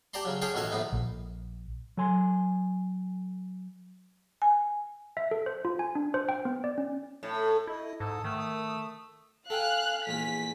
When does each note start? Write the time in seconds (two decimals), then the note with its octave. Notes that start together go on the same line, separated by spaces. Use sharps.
0.14 G4 D5 A5 A#5 C6
0.25 C#3 F#3
0.42 C#4 G#4 C#5 G5 A5 C6
0.54 A1 B2 D#3 F#4 A4 G#5
0.71 A#1 A2 B3 D#4
0.92 A#1
1.97 F#3 A4 G#5 C6
4.42 G#5
5.17 E5
5.31 A4
5.46 C5
5.65 F4
5.79 G#5
5.95 D4
6.14 C5
6.29 G5
6.45 B3
6.64 D5
6.78 C#4
7.23 A2
7.67 E4 D#5
8.00 G#2 A4 D#6
8.24 D#3 A3
8.38 D#6
9.50 A4 F5 G5 G#5 F#6
10.07 A#1 E2 G#5 B6